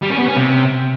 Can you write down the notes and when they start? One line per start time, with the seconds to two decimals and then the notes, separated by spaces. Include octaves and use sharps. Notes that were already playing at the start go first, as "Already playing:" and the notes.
0.02 G3
0.10 C#4
0.19 B3
0.27 C#4
0.36 C3